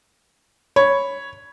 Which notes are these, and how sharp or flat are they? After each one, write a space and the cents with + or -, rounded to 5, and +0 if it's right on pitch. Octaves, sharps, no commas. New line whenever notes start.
C#5 +0 B5 +0